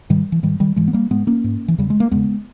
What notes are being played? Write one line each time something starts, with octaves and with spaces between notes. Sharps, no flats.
G#2 D#3 G3
E3
G#2 D#3 G3
D#3 G3
G#2 E3 G#3
B3
G3 A#3
G#2 G#3 B3
A#3 C#4
G#2
E3
E2 C#3 G3
G#3
A#3
E2 C#3 G#3 B3